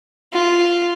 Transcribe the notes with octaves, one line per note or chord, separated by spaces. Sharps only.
F4